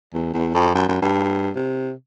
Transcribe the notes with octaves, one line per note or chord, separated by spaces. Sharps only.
E2
E2
F2
F#2
F#2
G2
C3